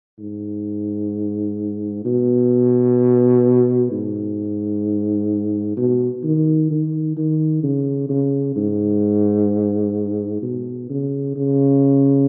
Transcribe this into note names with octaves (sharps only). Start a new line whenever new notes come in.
G#2
B2
G#2
B2
D#3
D#3
D#3
C#3
C#3
G#2
B2
C#3
C#3